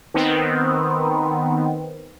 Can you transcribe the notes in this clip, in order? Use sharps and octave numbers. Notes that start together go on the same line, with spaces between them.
D#3 B3 C4